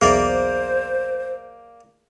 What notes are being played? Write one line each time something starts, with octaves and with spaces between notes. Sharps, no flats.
B1 E2 A#3 G#4 A#4 C5 D5 E5